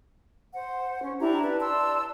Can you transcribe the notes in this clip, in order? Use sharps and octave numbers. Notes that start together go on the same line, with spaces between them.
C5 F#5
C#4
D4 E4 G4 A#5
B4 A5
D5 A5 C6 E6